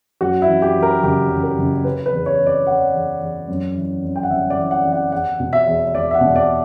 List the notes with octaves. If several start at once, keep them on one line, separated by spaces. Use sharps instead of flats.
F#2 F#4
E4
E3
G4
E3
A#4
F#1 G4
F#1
A#4
F#1
C#3 B4
B4
E2
C#5
E2
D5
E2 F#5
E2
E2
F#2
E3
F#2
G5
F#5
G1 E5
D5
E3
F#5
E3
F#5
E2 F#5
B2
E5
E2
E1 D5
E5
F#5
B2
D5